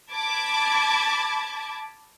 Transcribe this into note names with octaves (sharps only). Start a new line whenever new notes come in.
A5 B5 D6 G#6